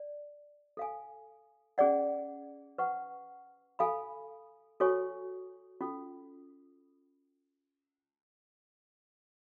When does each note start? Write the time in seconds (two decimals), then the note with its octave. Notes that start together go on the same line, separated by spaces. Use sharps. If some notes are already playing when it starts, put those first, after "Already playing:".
Already playing: D5
0.77 A4 F5 G#5
1.78 C#4 G#4 D5 F#5
2.78 B4 F#5 C#6
3.79 A4 F5 G#5 B5
4.80 F#4 A4 C#5 G#5 C#6
5.81 C#4 F4 A4